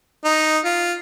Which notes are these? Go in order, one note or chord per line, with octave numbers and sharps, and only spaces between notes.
D#4
F4